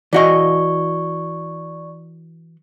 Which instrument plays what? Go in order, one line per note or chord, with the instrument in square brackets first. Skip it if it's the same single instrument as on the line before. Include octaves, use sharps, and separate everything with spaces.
[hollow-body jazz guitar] E3 F#4 D#5 [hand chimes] D5 C#6